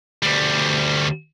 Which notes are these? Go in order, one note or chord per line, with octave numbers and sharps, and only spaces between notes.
D2 G3